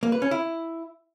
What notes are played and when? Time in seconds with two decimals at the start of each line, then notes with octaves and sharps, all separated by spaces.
0.03 A#3
0.12 B4
0.22 C#4
0.31 E4